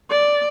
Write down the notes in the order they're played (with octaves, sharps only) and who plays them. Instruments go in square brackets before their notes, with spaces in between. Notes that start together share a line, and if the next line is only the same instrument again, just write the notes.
[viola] D5